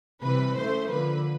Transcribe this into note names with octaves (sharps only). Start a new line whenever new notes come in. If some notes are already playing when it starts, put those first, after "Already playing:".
C3 E3 G3 B4
C#3 E3 A3 C5
D3 F3 A#3 B4